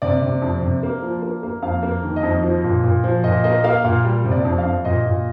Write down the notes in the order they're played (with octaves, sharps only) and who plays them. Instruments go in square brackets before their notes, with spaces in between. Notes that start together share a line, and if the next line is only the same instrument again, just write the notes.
[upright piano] C3 D5
C3
F2
C3
A#3
F3
A#3
A#3
F2 F5
A#3
D#3
D#5
F2
F3
A#2
A#2
F3
A#2 D#5
A#3 D#5
A#3 F5
A#2 F5
G3
C3
D5
F2
F5
F2
A#2 D#5
A#2